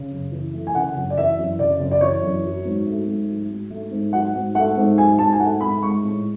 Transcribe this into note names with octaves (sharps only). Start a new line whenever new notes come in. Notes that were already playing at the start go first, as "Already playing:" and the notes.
Already playing: C#3
F#2
E3
A3
G#5
C#3 F#5
F#2
D5
E3 E5
F#2
C#3 D5
F#2
D5
E3 C#5
F#2
F#3
G#2
A3
G#2
F#3
G#2
A3
G#2
F#3 F#5
G#2
A3 F#5
G#2
F#3 G#5
G#2 A5
G#5
A3 F#5
G#2 B5
G#3 C#6
A2